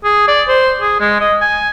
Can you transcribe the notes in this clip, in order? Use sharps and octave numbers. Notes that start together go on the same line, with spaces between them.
G#4
D5
C5
G#4
G#3
D#5
G#5